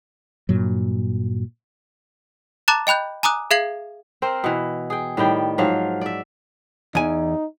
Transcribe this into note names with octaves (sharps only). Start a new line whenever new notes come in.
G2 A#2 F#3
A5 A#5 D6 F#6 A6 E7
D#5 G5 B5 F#6 G6
G#5 A#5 D6 D#6 F#6
G#4 E5 F5 G#6 C7 F#7
C4 A#4 C5
B2 E3
G#4 G5
A2 D#3 G3 G5
G#2 F3 F#3 F5
D5 E5
E2 D#4 G#5